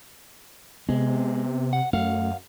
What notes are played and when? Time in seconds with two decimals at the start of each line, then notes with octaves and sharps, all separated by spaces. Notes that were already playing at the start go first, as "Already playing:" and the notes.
0.89 C3 G#3 B3
1.73 F#5
1.93 F#2 A3 F5 F#5